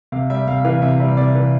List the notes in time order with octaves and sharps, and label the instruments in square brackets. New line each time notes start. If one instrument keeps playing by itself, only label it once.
[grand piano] C3 F5
G3 E5
C3 F5
E3 F5
C3 E5
G3
C3 D5
E3